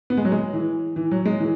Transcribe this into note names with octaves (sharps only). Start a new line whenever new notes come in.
B3
G#3
F#3
G#3
E3
E3
F#3
G#3
E3